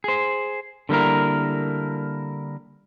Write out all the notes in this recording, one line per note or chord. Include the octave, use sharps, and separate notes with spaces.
G#4 C5
D3 G3 A#3 E4 A#4